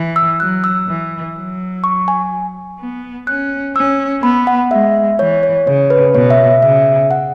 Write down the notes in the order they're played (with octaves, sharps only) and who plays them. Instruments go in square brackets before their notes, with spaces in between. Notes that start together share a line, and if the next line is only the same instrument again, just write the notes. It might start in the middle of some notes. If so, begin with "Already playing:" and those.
Already playing: [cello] E3
[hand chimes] E6
[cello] F#3 [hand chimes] F#6
[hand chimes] E6
[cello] E3
F#3
[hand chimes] C#6
G#5
[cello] B3
[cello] C#4 [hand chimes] F#6
[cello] C#4 [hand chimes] E6
[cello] B3 [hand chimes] B5
[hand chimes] F#5
[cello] G#3 [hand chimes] E5
[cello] E3 [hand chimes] C#5
[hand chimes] C#5
[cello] C#3 [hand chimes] C#5
[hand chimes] B4
[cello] B2 [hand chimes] C#5
[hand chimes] E5
[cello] C#3 [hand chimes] E5
[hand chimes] F#5